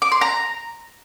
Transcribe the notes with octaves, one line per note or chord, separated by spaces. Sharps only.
D6
C6
A#5